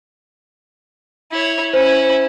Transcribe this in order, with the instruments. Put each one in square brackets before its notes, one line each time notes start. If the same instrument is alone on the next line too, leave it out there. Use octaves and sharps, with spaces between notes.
[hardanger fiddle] E4 C#5
[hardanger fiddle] C#4 E4 [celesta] C5